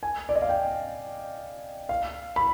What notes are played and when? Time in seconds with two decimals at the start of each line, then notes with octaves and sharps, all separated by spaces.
0.03 G#5
0.29 D5
0.35 D#5
0.42 F5
0.49 G5
1.89 F5
2.36 B5